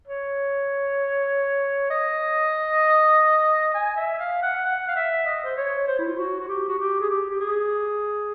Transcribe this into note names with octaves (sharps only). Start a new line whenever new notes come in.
C#5
D#5
G#5
E5
F5
F#5
F#5
F5
E5
D#5
C5
C#5
C5
E4
F4
F#4
F#4
G4
F#4
G4
G#4
G4
G4
G#4